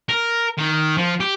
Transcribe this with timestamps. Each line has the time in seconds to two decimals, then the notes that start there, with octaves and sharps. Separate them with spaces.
0.09 A#4
0.58 D#3
0.98 F3
1.20 G4